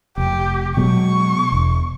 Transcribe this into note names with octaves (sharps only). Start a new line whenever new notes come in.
F1 G4
B2 F#3 G#3 C#6
E1